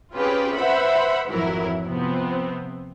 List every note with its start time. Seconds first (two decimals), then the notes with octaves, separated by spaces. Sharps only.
0.15 C4 C#4 F4 G4 G#4 B4
0.57 B4 C5 E5 F#5 B5
1.30 G#1 F2 E3 F#3 E4 A#4
1.85 C3 F3 B3 C4